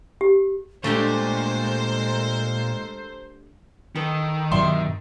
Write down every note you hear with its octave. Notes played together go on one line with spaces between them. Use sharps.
G4
A#2 G#3 A3 D4 G4 A4 A#4 C5
D#3 A4 B4
G2 B2 F#3 D4 E5 C6